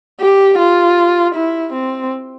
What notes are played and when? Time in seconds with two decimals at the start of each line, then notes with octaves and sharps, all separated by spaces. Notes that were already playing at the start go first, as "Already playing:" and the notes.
0.21 G4
0.59 F4
1.35 E4
1.73 C4